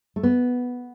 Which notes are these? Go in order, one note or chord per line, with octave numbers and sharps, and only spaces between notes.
A3
B3